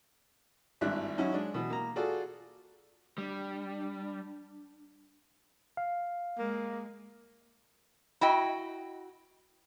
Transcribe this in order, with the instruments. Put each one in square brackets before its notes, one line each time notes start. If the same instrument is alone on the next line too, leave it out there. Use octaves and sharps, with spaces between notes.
[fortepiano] G#1 G2 D4 E4 F#6
F#3 C#4 D#4 E4 F#4
G#3 D4
B2 E3
A#3 A#5
F4 F#4 G#4 A4 D5
[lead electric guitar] G3 [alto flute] D4
[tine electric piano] F5
[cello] G#3 [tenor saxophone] A#3
[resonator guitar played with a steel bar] E4 F#4 D#5 G5